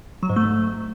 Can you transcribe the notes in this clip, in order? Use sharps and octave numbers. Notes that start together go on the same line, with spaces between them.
F#3
G#2
A3